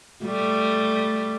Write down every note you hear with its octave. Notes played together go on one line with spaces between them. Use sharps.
G3 A3